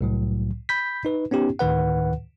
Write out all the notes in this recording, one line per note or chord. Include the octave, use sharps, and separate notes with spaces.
C2 A2 F#3
B5 G6 B6
D#4 B4
B3 C#4 D#4 G4
D2 A2 D#3 B4 F#5